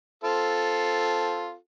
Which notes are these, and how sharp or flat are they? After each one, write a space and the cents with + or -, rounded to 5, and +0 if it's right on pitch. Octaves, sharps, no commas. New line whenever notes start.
C4 +0 F4 +0 A4 +0